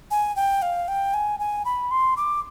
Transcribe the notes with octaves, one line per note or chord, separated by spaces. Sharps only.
G#5
G5
F5
G5
G#5
G#5
B5
C6
D6